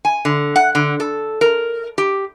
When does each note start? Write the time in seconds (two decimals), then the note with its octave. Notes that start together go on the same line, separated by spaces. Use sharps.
0.05 G#5
0.25 D3
0.56 F#5
0.75 D3
1.00 A4
1.41 A#4
1.98 G4